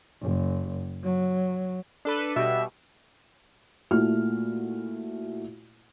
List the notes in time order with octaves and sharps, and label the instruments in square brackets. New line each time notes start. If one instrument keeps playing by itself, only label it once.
[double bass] F#1
F#3
[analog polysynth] D4 A4 B4
[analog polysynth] B2 G3 [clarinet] E5
[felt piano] A#2 A3 E4 F#4 F6